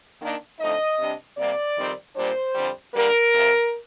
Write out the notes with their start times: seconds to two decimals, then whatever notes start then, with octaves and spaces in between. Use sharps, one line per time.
0.21 D#3 A#3 D4
0.59 F2 D3 A3 D#4 D#5
0.99 C3 G3 D4
1.38 C3 G3 A#3 D5
1.77 F2 D#3 G3 C4 D#4
2.16 A#2 G3 D4 C5
2.55 F2 D3 G3
2.94 D3 G3 A#3 A#4
3.33 F2 C3 F3